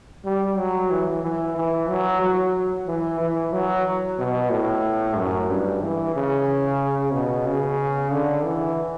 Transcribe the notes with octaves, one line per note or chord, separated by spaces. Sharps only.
G3
F#3
E3
E3
E3
F#3
F#3
E3
E3
F#3
B2
A2
F#2
G2
E3
C#3
B2
C#3
D3
E3